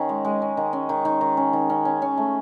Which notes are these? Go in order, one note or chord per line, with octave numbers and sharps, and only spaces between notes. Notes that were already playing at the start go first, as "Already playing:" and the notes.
Already playing: D#3 C#4
G#3
G#3
C#4
D#3
C#4
D#3
D#3
D#3
C#4
D#3
C#4
C#4
C#4
A3